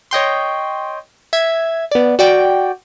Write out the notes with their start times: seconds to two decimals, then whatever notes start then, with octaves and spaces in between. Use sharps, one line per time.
0.11 C#5 D#5 G5 C6
1.33 E5 G#6
1.91 B3 D5
2.19 F#4 D5 G5